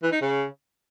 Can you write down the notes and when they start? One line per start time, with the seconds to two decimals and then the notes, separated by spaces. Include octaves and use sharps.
0.02 E3
0.12 D#4
0.21 C#3